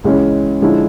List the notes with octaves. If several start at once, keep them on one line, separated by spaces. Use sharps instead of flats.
C#2 C#3 E3 G#3 C#4
D3 F3 G#3 C#4 E4